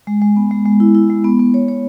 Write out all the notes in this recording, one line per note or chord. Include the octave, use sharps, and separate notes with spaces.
G#3
G#3
B3
G#3
G#3
E4
E4
G#3
B3
B3
C#5
C#5